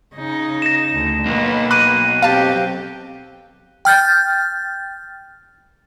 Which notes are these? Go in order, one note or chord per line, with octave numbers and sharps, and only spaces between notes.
C#3 D#4
A#6 E7
D2
B1 A#3 B4
B5 D6 F#6 D#7
C4 G4 F5 A5
G5 F6 G6 A6